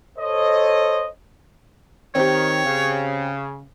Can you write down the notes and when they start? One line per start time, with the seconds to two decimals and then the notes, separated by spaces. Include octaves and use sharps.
0.18 A4 C5 C#5 D#5
2.15 D#3 C4 G4 C#5
2.65 C#3